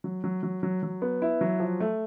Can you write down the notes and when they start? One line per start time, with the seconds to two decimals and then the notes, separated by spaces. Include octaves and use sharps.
0.04 F#3
0.24 F#3
0.43 F#3
0.63 F#3
0.83 F#3
1.02 B3
1.22 E4
1.41 F#3
1.60 F3
1.80 A3